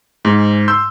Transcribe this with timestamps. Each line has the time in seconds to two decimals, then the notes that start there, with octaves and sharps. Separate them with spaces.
0.25 G#2
0.68 C6 E6 G6